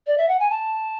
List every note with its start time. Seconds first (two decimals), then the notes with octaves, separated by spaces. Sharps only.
0.07 D5
0.17 E5
0.28 F#5
0.39 G#5
0.50 A5